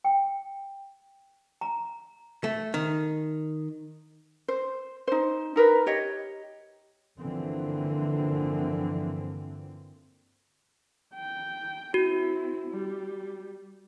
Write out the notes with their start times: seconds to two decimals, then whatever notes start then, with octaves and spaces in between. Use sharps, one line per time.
0.04 G5
1.61 A#5
2.44 A3
2.74 D#3
4.48 C5
5.08 D#4 C5
5.56 D#4 A#4 B4
5.86 G4 C#5 D#5
7.19 G2 D3 E3 F3 A#3 C4
11.15 G5
11.94 C4 E4 F#4
12.70 G3